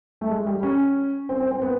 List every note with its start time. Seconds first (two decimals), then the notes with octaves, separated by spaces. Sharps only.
0.21 A3
0.30 G#3
0.47 G3
0.63 C#4
1.29 C4
1.40 C4
1.51 C4
1.62 B3